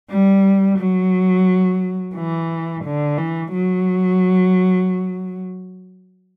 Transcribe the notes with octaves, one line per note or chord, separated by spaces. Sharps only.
G3
F#3
E3
D3
E3
F#3